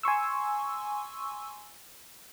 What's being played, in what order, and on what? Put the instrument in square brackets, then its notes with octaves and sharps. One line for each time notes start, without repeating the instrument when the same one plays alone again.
[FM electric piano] G#5 C6 C#6 E6